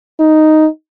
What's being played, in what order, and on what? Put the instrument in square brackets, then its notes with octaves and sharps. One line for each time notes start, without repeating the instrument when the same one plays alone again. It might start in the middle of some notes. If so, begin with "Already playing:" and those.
[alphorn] D#4